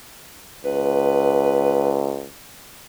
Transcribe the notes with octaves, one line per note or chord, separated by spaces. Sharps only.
C#2 B4